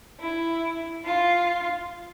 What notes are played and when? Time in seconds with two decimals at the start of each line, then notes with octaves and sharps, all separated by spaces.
0.20 E4
1.04 F4